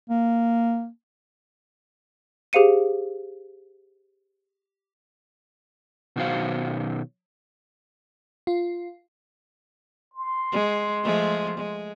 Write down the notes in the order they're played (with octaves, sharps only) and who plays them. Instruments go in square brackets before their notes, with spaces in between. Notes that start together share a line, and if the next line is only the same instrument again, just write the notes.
[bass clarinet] A#3
[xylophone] G4 G#4 C5 F5 C#7 D#7
[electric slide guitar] B2 D#3 F#3 F#4 C5 F5
[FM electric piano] F4
[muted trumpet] C6
[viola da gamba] G#3
F3 G#3 A3
G#3